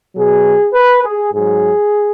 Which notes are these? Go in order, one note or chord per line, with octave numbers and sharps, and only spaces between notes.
B2 F#3 G#4
B4
G#4
G#2 F#3 G#4